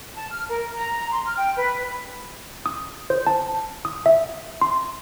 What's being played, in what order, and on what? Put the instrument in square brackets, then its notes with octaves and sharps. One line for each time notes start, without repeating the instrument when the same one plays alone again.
[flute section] A5
F6
A#4
A#5
C6
F6
G5
B4
[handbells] D#6
C5
A5
D#6
E5
C6